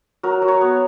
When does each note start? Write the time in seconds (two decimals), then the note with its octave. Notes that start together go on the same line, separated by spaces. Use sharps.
0.23 F#3 A#4
0.42 F#3
0.48 C#5
0.61 B3